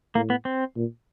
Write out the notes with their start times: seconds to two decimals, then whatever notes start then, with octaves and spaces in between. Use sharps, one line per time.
0.15 A2 A#3
0.30 B3
0.45 C4
0.76 A#2